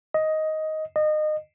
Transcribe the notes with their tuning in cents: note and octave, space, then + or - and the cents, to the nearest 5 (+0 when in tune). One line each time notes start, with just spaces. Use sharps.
D#5 +10
D#5 -25